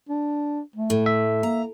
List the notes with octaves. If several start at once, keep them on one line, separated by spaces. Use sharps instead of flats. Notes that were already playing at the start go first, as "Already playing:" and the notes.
D4
A3
A2
E5
A#3 A#5